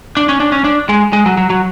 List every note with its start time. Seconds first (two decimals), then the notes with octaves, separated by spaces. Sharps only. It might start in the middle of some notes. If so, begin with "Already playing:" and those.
0.17 D4
0.29 C#4
0.40 D4
0.52 C#4
0.64 D4
0.89 G#3
1.13 G#3
1.26 F#3
1.37 F#3
1.50 F#3